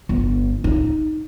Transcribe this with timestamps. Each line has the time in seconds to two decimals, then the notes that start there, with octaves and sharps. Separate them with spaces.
0.09 G1
0.64 D#4